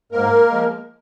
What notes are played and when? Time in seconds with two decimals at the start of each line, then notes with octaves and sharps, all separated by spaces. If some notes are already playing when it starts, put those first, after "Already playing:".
0.12 G#2 A#3 A#4
0.49 F3 G#3